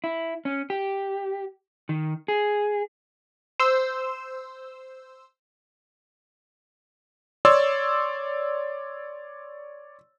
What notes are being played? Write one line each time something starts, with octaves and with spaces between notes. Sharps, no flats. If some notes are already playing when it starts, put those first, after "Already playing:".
E4
C#4
G4
D#3
G#4
C5 E6
C#5 D5 C6 E6